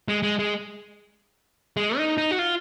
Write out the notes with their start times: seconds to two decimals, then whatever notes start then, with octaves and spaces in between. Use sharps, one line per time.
0.08 G#3
0.23 G#3
0.39 G#3
1.77 G#3
1.98 D#4
2.18 D#4
2.31 F#4
2.39 F4